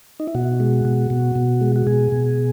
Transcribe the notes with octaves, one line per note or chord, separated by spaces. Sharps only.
D#4
E4
B2 F#4
G#3
B2
B2
B2
G#3
F#4
B2 G#4
B2